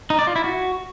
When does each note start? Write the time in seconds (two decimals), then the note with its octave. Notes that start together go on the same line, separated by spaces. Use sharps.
0.10 D#4
0.19 D5
0.27 F4
0.36 E4
0.44 F#4